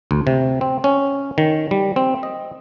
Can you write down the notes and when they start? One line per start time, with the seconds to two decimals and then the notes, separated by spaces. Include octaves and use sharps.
0.11 D2
0.27 C3
0.61 C4
0.84 C#4
1.38 D#3
1.71 G3
1.96 C4
2.23 D#5